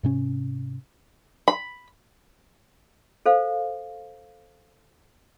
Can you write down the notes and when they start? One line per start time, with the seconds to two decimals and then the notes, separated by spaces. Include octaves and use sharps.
0.03 G#2 C3 C#4
1.48 B5
3.26 A4 C5 F5